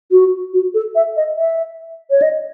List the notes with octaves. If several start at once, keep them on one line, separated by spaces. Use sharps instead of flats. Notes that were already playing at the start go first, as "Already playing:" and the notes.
F#4
F#4
A4
E5
D#5
E5
C#5
D#5